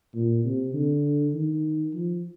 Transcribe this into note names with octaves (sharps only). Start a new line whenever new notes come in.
A#2
C3
D3
D#3
F3